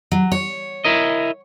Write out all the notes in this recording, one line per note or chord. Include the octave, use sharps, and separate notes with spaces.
F#3
C#5
E4 A#4 D#5